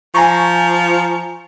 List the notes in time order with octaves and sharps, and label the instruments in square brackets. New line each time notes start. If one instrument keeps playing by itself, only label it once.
[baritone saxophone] F3 [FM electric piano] G#5 A#5 C#6